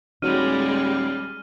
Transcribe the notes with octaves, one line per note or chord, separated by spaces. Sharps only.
D#1 G3 G#3 D#4 F#4 C#5 F6 D#7